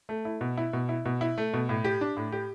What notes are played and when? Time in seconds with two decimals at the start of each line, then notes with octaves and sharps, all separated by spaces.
0.09 A3
0.25 E4
0.41 B2
0.57 E4
0.73 B2
0.89 E4
1.05 B2
1.21 E4
1.38 A3
1.53 B2
1.69 A2
1.84 G4
2.01 D4
2.17 A2
2.32 G4